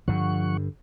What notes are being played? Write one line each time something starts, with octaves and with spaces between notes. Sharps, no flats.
G2 D3 F3 F#5 C#6